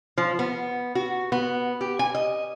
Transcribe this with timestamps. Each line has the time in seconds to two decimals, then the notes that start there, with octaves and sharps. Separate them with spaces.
0.18 F3
0.39 B3
0.95 F#4
1.32 B3
1.81 G4
1.99 G#5
2.15 D#5